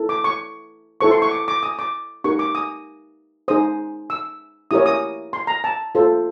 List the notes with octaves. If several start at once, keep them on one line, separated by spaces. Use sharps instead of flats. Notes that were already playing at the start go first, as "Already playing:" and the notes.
Already playing: E4 A4
D6
C#6
E4 A4 C5 C#6
C6
C#6
D6
D6
D#6
D6
D#4 G4 A#4 C#6
D6
D#6
D#4 G#4 C5 D#6
E6
E4 G4 A#4 C#5 D#6
D#6
C6
A#5
A5
F4 A4 C5